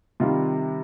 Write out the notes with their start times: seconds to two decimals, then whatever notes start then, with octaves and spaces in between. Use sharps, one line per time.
0.20 C3 D#3 G3 F4